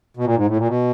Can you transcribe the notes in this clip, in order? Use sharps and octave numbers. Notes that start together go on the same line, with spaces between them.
B2
A#2
G#2
A2
A#2
B2